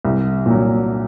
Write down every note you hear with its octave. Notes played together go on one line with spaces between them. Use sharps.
C2
A#2 F#3